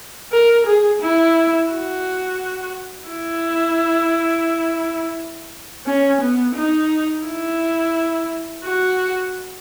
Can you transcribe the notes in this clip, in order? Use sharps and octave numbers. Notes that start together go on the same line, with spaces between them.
A#4
G#4
E4
F#4
E4
C#4
B3
D#4
E4
F#4